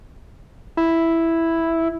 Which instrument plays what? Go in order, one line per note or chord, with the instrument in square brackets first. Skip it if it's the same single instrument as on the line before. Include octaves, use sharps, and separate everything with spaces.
[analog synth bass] E4